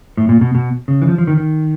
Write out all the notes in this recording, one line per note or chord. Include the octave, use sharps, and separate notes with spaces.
A2
A#2
B2
B2
C#3
E3
F3
F3
D#3
D#3